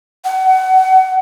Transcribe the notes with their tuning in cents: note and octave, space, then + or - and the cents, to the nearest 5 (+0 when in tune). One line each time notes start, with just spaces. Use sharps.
F#5 +25